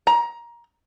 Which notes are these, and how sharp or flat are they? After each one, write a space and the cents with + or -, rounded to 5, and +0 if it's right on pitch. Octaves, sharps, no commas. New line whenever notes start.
A#5 +20